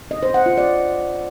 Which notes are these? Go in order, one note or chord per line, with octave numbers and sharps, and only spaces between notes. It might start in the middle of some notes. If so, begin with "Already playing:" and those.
D#5
C5
F#5
F4
D5